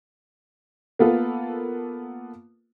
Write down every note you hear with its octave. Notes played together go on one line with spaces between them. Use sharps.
A#3 B3 F4 A4